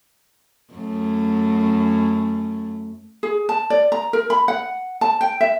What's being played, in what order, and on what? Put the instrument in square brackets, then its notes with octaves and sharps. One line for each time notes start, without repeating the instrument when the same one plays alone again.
[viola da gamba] F#2 A3
[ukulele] G#4
A5
D5
A#5
A#4
B5
F#5
A5
G5
E5